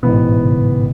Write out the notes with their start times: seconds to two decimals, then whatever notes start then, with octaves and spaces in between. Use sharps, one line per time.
0.03 A1 G#2 B2 E3 B3
0.43 C#3